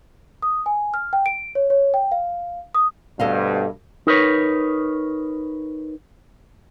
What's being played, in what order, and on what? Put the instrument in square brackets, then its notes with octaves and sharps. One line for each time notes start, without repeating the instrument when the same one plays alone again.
[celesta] D#6
G#5
F6
G5
D7
C#5
C#5
G5
F5
D#6
[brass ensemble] D2 G2 B2 [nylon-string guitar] A4 D#5 F5
[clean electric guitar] D#4 A#4 B4 C#5